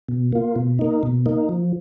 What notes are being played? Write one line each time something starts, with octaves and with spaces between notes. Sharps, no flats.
B2
A#3 F4
B2
A#3 D#4
B2
A#3 D#4
F3